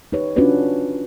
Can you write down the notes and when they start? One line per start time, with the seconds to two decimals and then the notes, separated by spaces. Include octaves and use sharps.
0.12 D#4 G4 B4 C#5
0.36 C#4 D4 F4 F#4 B4 D5